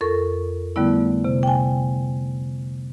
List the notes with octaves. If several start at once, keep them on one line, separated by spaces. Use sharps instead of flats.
F2 A4 A#4 C#6
D3 G3 A3 B3 E4
C3
G5 G#5